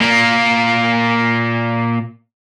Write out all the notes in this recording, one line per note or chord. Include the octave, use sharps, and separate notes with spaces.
A#2 A#3